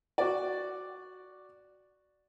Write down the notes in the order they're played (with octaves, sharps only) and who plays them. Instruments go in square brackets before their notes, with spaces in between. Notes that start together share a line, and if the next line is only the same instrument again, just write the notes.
[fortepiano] F#4 D5